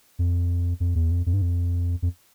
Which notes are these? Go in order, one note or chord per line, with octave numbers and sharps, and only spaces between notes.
F2
F2
E2
F2
F2
G2
F2
F2